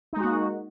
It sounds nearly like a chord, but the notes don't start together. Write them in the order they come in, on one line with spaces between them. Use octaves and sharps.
D#4 G#3 F#4 A#3